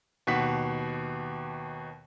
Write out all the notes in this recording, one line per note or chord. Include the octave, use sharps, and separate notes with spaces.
D#2 B2 F#5 B6